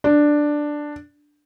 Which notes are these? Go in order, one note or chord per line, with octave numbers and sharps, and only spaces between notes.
D4